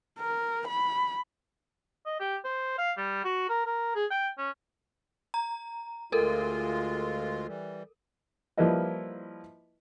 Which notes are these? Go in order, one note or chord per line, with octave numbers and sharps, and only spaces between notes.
A#4
B5
D#5
G4
C5
F5
G3
F#4
A#4
A#4
G#4
G5
C#4
A#5
D2 G#3 F4 A4 A#4
E3 G3
F3 G3 A#3 E4 B4 D#5